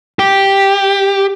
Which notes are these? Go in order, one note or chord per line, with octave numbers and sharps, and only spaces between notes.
G4